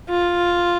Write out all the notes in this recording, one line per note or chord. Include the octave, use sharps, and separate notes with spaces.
F4